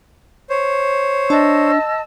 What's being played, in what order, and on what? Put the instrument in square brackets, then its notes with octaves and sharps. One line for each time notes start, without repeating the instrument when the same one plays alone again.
[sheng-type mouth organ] C5 C#5
[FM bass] D4 [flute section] D#5 A5 E6